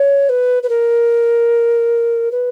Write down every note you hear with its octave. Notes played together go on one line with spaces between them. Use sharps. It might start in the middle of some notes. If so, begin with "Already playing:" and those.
Already playing: C#5
B4
B4
A#4
B4